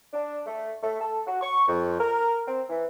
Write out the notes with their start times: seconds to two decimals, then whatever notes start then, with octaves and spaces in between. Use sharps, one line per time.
0.13 D4
0.46 A3
0.83 A3
1.01 A4
1.27 F#4
1.41 C#6
1.68 F2
2.00 A#4
2.47 C4
2.69 E3